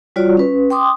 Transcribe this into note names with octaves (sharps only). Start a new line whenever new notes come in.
G3 F4 F#4 C#5 D5
C#4 B4
G5 C6 D6 D#6